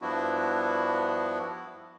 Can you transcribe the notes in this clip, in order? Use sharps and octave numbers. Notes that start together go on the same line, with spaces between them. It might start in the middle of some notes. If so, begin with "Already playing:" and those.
G2 F3 B3 D4 E4 F#4